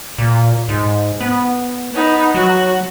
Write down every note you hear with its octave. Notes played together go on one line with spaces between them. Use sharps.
A#2
G#2
B3
B3 D#4
F#3 F#4